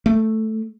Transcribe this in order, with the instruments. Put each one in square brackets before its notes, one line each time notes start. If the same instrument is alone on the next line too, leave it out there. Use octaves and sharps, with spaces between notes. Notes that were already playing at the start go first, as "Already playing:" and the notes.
[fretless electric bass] A3